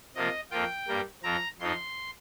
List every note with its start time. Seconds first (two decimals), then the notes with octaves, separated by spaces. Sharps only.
0.15 C3 F3 A#3 F4 D#5
0.51 F2 F3 A#3 F4 G5
0.88 G2 G3 A#3
1.23 F2 F3 C4 A#5
1.59 F2 F3 D#4 C6